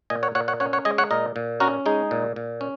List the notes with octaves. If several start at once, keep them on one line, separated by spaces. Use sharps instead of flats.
A#2 D#5 G#5
C#5 F#5
A#2 C#5 F#5
C#5 F#5
C#4 C#5 F#5
C#5 F#5
G#3 D#5 G#5
C#5 F#5
A#2 A#4 D#5
A#2
C#4 F#4 A#4
G#3 D#4 G#4
A#2
A#2
C#4